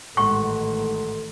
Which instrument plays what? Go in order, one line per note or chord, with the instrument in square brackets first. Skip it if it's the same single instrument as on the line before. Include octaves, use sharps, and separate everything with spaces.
[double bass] A1 D#3 [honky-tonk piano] G#2 F#5 [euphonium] A4 [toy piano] C#6